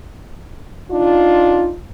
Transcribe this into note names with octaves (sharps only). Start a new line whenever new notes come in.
D4 D#4 F4